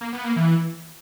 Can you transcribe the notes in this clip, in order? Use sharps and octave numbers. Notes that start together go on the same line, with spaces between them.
A#3
B3
A#3
E3